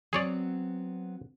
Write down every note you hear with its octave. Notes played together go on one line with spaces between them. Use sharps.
F#3 B3 C4 G#4 C#5 D5